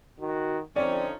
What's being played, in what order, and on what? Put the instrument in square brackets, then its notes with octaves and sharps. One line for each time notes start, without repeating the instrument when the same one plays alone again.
[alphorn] D#3 [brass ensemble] F#4
[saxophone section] F2 C#4 [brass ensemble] D3 F3 D#4 [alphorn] C4 [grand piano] D5